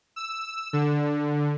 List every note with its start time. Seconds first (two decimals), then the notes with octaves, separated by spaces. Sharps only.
0.16 E6
0.73 D3